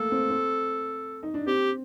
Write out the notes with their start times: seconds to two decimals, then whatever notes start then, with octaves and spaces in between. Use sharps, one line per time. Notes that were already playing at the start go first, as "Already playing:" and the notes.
Already playing: A3 A#3 A4
0.11 C4
0.30 C4
1.23 D#4
1.34 D4
1.47 C4 G4